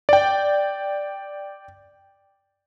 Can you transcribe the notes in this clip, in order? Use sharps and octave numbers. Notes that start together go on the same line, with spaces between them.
D5 G5